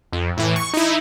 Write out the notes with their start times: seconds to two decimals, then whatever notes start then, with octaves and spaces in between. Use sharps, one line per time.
0.12 F2
0.37 A2 E3
0.56 C#6
0.73 D#4 E4